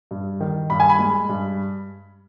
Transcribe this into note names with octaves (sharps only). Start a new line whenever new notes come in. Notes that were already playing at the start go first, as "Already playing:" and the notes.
G2
D#3
G2 B5
G#5
B5
G#3
G2